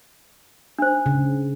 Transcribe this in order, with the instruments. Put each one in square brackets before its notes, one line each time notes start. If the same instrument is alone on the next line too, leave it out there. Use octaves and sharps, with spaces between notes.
[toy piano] D4 C5
[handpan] C#3